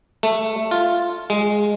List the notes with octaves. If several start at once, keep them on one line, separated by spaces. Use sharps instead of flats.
A3
F4
G#3